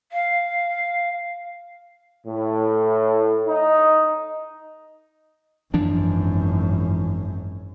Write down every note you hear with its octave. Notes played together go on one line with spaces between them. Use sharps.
F5
A2
D#4
G#1 F#2 E3 F3 D4